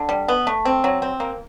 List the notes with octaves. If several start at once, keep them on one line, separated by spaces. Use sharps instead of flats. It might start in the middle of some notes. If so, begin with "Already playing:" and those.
Already playing: D3
G3
B3
A3
C4
F#3
C4
A#3